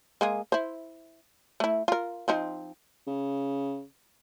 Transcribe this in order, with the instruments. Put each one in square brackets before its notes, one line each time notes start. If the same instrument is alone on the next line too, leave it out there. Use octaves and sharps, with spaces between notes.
[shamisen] G#3 A#3 G#4
E4 C5
A3 E4
F4 A#4
F3 C4 D#4
[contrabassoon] C#3